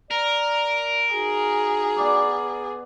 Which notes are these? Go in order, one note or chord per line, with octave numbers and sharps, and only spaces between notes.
A#4 D5
D#4 F#4 G#4
B3 D5 D6